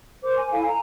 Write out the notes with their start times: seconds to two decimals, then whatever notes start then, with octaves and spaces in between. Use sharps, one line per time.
0.24 A#4 C5 D6
0.36 G#5
0.51 E4 A4 F5 G#5
0.68 A#5